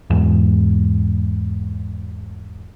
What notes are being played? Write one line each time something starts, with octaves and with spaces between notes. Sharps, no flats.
E2 G#2